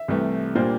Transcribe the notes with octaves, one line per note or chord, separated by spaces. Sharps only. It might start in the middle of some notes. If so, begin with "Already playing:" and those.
Already playing: E5
C2 C3 E3 A3
A#2 G3 A#3 D4 C5